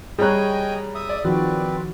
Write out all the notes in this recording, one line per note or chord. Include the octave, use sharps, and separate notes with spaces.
G3 G#4 C#5 D#5 G5 G#5 A#5 F#6
E5 D#6
D5
D#3 F3 C4 F#4 B4